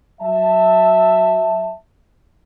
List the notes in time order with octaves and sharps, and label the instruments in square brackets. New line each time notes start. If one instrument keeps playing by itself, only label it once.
[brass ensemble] F#3 E5 A5